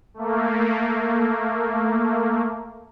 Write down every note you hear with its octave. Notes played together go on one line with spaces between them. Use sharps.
A3 A#3